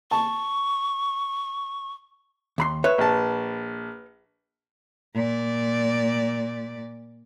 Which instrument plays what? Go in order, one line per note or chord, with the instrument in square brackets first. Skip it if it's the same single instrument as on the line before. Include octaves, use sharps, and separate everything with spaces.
[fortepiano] A5 [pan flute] C#6
[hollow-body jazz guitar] D#2 B5 C6
[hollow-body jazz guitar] B4 C#5 [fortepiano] E5
[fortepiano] A#1 A5
[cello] A#2 D5